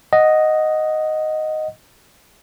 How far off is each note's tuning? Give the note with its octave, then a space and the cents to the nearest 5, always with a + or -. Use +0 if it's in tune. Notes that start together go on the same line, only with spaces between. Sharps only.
D#5 +0 F#5 +0